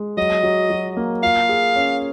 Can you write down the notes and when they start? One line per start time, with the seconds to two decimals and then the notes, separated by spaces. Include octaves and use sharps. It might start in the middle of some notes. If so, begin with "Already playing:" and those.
Already playing: G#3
0.17 F#3 D#5
0.43 F#3
0.70 F#3
0.97 A#3
1.22 F4 F5
1.49 G#4
1.76 C#4